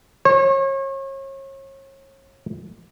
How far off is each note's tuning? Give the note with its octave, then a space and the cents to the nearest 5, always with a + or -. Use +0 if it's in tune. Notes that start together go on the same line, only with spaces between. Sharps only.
C#5 -35